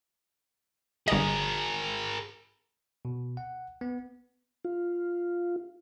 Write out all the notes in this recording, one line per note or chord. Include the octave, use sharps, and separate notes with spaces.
G1 G#4 A#4 D#5
B2
F#5
B3
F4